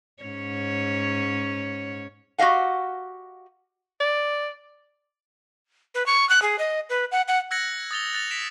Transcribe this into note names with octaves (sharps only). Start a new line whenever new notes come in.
G#2 C#4 C#5
F#4 G4 D#5 F5 F#5
D5
B4
C#6
F#6
G#4
D#5
B4
F#5
F#5
E6 F#6 G#6 A#6 C#7 F#7
D#6 A6 F7 G7
F#6 A6 F7
B6 D7 E7